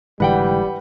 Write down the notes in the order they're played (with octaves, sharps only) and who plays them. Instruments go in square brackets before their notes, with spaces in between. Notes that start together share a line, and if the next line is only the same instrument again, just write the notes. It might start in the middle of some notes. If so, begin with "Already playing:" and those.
[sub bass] F#1 [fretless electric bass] G#2 D3 E3 [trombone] G3 [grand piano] B4 F#5 G5